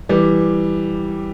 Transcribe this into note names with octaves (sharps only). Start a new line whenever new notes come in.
E3 G3